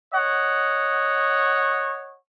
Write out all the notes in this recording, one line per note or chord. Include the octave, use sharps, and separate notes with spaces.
C#5 D#5 F#5